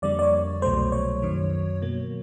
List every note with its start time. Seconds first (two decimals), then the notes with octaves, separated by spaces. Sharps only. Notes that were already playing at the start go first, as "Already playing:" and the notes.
0.02 F2 D3 G3 A#3 D5
0.19 D5
0.22 C#5
0.62 C2 B2 F#3 A3 C5
0.92 C#5
1.22 F#2 D#3 F#3
1.82 B2 F#3 A#3